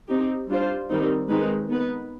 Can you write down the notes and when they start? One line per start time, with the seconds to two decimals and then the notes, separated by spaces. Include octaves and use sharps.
0.08 C4 D#4 G4
0.49 G3 D4 F4 C5
0.89 D#3 G3 C4 D#4
1.29 D#3 G#3 C4 D#4 B4
1.69 B3 D#4 B4